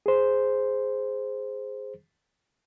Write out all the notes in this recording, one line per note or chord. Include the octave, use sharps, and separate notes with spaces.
G#4 C5